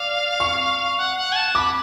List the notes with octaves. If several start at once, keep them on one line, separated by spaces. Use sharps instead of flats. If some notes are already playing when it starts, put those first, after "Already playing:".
Already playing: D5 F5
C#6
F#5
F#5
G#5
A5
B5 D6